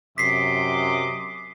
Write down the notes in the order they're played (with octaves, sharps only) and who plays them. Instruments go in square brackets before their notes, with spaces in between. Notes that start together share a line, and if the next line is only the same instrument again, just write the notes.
[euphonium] F#2 [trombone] C3 [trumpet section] D#5 C6 D6 [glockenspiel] B6 C7